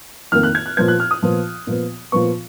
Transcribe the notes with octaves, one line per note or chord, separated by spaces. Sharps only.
F2 D#3 A#3 F6
F#6
G#6
F#6
A#2 F3 B3 G#6
F#6
F6
D#6
A#2 F3 B3
A#2 F3 B3
A#2 F3 B3 C#6